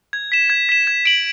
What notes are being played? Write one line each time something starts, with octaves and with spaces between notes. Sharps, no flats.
G#6
B6 E7
G#6
B6 E7
G#6
D7 F#7